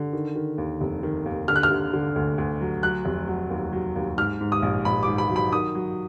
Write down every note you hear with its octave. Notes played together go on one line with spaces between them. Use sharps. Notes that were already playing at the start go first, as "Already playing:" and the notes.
Already playing: D3
D#3
D#3
D#2
F1
D#3
D#2
D3 F6
F#6
F6
D3
D3
D2
D2
F#3
F#3 F#6
F1
F#3
D#2
F#3
D#2
G#2 F6
G#2
D#6
A#1
A#1 B5
G#2 D6
B5
F#3
B5
D#3 D#6
F#3